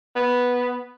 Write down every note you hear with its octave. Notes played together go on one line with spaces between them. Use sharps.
B3